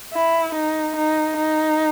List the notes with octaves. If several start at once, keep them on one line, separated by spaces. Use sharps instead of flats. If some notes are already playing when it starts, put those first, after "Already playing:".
E4
D#4
D#4
D#4